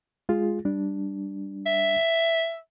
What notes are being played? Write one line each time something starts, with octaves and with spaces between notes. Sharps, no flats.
G#3 F4 G#4
G3 D4
E5